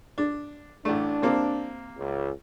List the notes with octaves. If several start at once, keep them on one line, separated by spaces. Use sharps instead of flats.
D4
A1 A3 D4
C3 A#3 C4
C#2